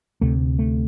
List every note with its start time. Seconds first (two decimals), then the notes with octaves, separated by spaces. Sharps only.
0.21 D2 C3 A3
0.59 A3